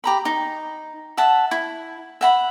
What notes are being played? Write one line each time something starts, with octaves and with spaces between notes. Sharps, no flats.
G4 A#5 B5
D#4
E5 F#5 A5
E4
E5 F#5 B5